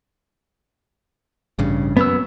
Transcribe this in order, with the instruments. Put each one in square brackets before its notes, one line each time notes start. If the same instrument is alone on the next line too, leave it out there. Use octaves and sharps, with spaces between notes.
[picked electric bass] A1 G2 C#3
[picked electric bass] F#2 [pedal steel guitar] B3 E6